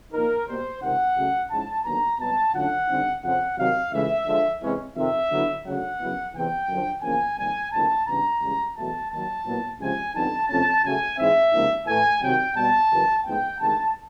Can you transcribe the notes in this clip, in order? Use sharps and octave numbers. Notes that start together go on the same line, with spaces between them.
A#2 F3 A#3 D#4 A#4
B2 G3 A#3 C5
C#2 C3 D#3 F#5
C#3 F#3 A3
G#2 F3 G#3 C#4 E4 A5
D#2 D3 F#3 B3 A#5
C2 B2 F#3 B3 A5
D3 F#3 A3 C#4 F4 F#5
D3 G3 C4 D#4
F2 C#3 F3 F#5
C3 D#3 F#3 F5
C#2 C#3 E3 A3 E5
D3 F3 G#3
C3 E3 G#3 C#4
F2 C3 D#3 E5
D3 F#3 B3 E4
D2 C#3 F#3 F#5
F#2 C#3 F#3 B3 E4
E2 C3 E3 G5
F#2 D3 F3
E2 C#3 F3 A#3 C#4 G#5
F2 C3 D#3 G3 A#3 G#5
D2 C#3 F3 A#3 D#4 A5
C#3 E3 G3 B3 D4 A#5
C#2 C#3 E3 G3
E2 B2 F#3 A3 A5
D#2 D#3 F#3 A5
A#2 F#3 B3 E4
C#2 C3 F3 G#5
F2 D3 G3 B3 D#4 A5
F2 C3 F3 A3 C#4 A5
C#3 F#3 A3 G#5
G#2 E3 G#3 C4 D#4 E5
C#2 C3 F3 A#3 D#4
A2 E3 A3 G#5
C3 D#3 F#3 G5
B2 G3 B3 A5
F#2 C#3 E3
A2 F3 G#3 B3 D#4 G5
D2 C3 D#3 G#3 A5